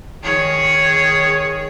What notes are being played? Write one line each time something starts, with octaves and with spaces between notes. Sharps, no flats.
D#3 G#4 C#5